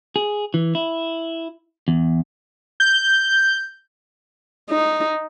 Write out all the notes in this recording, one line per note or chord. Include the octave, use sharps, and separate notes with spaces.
G#4
E3
E4
E2
G6
D#4